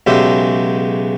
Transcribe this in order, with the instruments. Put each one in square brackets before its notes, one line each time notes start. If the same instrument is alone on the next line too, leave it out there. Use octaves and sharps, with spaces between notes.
[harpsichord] B1 C#3 F#3 G#3 G4 E5